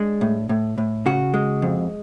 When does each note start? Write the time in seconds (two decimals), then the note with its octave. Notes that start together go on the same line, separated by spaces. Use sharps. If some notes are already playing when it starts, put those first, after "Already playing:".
Already playing: G#3 D4
0.21 A2
0.49 A2
0.78 A2
1.06 C#3 F#4
1.34 G#3
1.62 F2